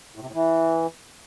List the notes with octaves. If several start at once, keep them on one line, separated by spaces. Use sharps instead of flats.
A2
C3
A2
E3